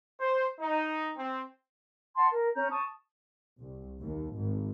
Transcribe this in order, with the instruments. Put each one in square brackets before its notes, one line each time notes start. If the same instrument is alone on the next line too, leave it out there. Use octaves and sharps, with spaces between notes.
[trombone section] C5
D#4
C4
[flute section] F#5 A5 C6
A#4
C#4 A#5 G6
A5 C#6 D#6
[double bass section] C2
D#2
G#1